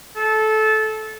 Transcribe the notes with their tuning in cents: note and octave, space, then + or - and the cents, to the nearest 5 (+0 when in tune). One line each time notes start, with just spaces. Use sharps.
A4 -20